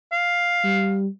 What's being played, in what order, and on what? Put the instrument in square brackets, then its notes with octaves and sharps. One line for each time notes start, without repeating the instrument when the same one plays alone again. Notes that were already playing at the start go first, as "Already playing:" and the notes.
[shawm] F5
[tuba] G3